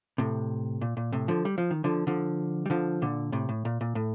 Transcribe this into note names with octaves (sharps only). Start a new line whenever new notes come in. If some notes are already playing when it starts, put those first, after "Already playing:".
A2 C3
A#2
A#2
A2 C3
D3 F3
G3
F3
D#3
D3 F3
D3 F3
G3
D3 F3
A#2 D3
A2 C3
A2
A#2
A#2
A2